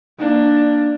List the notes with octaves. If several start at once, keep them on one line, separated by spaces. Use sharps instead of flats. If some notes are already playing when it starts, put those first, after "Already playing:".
A#3 D4